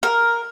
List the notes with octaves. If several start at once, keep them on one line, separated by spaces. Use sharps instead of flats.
A#4